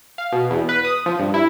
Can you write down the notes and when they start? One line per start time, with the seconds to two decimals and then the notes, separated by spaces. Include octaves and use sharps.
0.18 F5
0.32 B2
0.50 E2
0.69 B4
0.85 D#6
1.06 F3
1.19 G2
1.34 E4